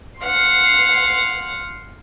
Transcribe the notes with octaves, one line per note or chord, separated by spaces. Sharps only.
F5 F#5 C6